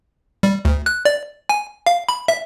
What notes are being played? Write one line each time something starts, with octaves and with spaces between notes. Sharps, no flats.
G3
D2
F#6
D5
G#5
F5
B5
E5